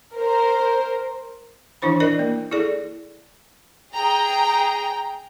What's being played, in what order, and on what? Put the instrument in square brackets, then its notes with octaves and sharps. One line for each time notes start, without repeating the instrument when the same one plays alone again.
[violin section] A#4 C5
[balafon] E3 D4 E4 C5 B5
E4 A#4 D5 D#5
A#3
E4 G#4 A4 D5
[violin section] G#4 G5 A#5